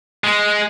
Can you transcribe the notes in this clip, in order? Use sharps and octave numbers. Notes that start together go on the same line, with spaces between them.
G#3